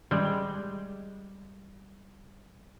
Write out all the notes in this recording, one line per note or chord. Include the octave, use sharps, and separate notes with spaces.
G3 G#3